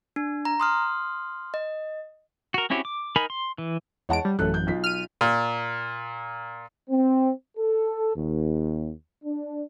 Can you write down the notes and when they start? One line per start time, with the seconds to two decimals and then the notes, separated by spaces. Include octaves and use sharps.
0.16 D4
0.45 A#5
0.60 C6 D#6 F6
1.54 D#5
2.54 F#4 A#4
2.70 C4 C#4 E4 F#4 G4
2.85 D6
3.16 D#4 A#4 G#5 B5
3.30 C6
3.58 E3
4.09 E2 G#3 C#5 F#5 A5 D7
4.25 G3
4.39 A1 F#2 A3 A4 F#6
4.54 G6
4.67 B1 F4 B6
4.84 F6 D#7
5.21 A#2
6.90 C4
7.58 A4
8.15 D#2
9.25 D4